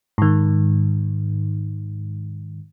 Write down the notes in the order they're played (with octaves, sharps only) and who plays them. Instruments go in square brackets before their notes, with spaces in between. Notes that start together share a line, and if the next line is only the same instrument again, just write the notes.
[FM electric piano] G#2 D#3